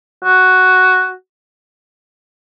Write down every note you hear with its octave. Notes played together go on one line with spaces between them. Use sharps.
F#4